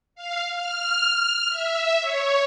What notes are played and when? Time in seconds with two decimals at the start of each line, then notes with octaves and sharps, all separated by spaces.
0.15 F5
0.54 F6
1.49 E5
2.00 C#5